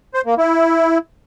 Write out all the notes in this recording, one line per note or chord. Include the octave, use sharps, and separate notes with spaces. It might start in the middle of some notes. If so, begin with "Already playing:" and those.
C5
A#3
E4